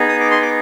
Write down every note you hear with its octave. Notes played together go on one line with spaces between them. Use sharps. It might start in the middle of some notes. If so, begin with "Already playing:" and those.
Already playing: B3 D#4 G#4
D#6
D6
C6
D6